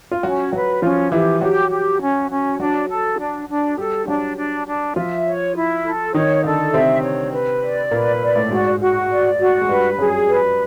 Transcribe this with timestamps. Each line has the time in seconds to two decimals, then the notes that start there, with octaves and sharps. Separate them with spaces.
0.11 F4
0.23 F#3 C#4 F#4
0.53 F#3 F#4 B4
0.82 F3 C#4 F4
1.12 E3 E4 G4
1.41 F#3 F#4 G4
1.71 G4
2.01 C#4
2.30 C#4
2.59 F#3 D4 F#4
2.89 A4
3.19 D4
3.49 D4
3.78 G3 G4 A4
4.07 F#3 D4 F#4
4.36 D4
4.66 D4
4.96 F3 F4 E5
5.25 C#5
5.55 E4
5.85 A4
6.14 D#3 D#4 C#5
6.44 D3 D4 A4
6.73 C3 C4 E5
7.02 C#5
7.32 B4
7.62 D5
7.91 A#2 A#3 B4
8.21 D5
8.36 A2 A3
8.51 G#2 G#3 F#4
8.80 F#4
9.10 D5
9.40 F#4
9.61 G#3
9.69 G2 G3 B4
9.98 F#2 F#3 G#4
10.29 B4